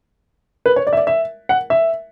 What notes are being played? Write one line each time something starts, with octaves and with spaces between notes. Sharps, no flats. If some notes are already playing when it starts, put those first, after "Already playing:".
B4
C#5
D5
E5
D5
E5
F#5
E5